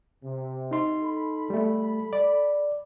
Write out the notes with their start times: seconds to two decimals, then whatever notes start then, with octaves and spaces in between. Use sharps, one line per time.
0.23 C3
0.71 D#4 C6
1.03 A4 B5
1.50 G3 A3
2.13 D5